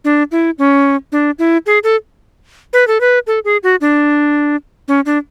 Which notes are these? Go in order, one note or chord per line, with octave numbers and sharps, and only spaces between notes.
D4
E4
C#4
D4
E4
G#4
A4
B4
A4
B4
A4
G#4
F#4
D4
C#4
D4